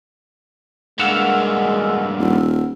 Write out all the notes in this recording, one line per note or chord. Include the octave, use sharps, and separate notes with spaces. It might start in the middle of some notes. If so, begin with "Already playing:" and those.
G2 G#3 A#3 F#5 E6 F6
D#1